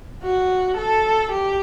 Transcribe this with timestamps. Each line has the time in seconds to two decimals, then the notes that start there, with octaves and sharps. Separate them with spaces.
0.24 F#4
0.77 A4
1.32 G4